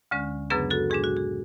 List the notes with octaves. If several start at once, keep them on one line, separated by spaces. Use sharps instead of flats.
D2 D3 G#3 C#4
F#2 C#3 F#3 B3 D4 G#4 B4
F#4 A4
A2 G#3 D4 G#4
F#4
G#4